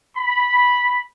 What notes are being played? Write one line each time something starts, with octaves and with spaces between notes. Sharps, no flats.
B5